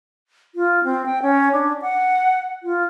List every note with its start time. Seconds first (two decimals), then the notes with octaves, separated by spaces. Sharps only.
0.55 F4
0.84 C4
1.06 G5
1.22 C#4
1.52 D4
1.82 F#5
2.63 F4